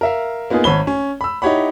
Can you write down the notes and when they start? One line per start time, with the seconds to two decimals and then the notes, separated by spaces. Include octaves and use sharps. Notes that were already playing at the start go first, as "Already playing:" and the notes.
0.01 A#4 E5 F5
0.50 A#3 B3 D#4 F4 G#4
0.64 G#1 C#5 B5 G7
0.87 C#4
1.21 B5 E6
1.42 D#4 E4 G4 C#5 F#5 B5